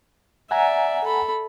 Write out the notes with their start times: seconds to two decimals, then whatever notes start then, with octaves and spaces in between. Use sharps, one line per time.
0.51 D5 E5 F#5 G#5 A#5
1.04 A4 B5